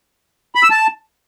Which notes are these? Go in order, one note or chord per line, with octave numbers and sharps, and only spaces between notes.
B5
E6
A5